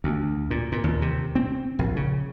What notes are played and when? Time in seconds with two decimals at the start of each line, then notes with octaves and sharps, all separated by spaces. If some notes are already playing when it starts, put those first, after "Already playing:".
0.04 D2
0.51 A#2
0.72 A#2
0.84 D#2
1.02 C3
1.35 C4
1.79 A#1
1.96 C#3